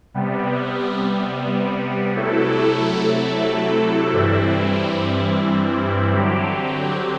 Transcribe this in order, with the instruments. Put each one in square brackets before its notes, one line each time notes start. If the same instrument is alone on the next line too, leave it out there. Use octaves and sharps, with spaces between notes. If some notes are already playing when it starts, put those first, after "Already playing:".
[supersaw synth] C3 G3 B3
C3 F#3 A3 E4 A4
G2 E3 G3 C4 E4
D3 F#3 C4 G4